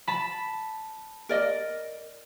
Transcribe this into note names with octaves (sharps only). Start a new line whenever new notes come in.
A5 B5
A#4 D5 D#5